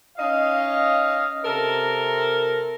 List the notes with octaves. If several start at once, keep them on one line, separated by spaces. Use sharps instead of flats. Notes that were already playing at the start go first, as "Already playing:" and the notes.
C#4 D#4 D#5 F5
C3 A4 A#4